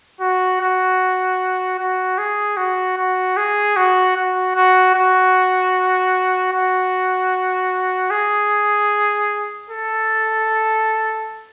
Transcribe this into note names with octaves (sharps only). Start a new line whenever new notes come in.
F#4
F#4
F#4
G#4
F#4
F#4
G#4
F#4
F#4
F#4
F#4
F#4
G#4
A4